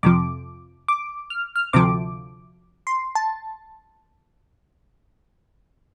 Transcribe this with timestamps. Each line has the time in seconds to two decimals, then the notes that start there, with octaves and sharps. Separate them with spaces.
0.03 F2 C3 F3 D6
0.88 D6
1.30 F6
1.56 F6
1.73 D2 C3 F3 D6
2.87 C6
3.15 A5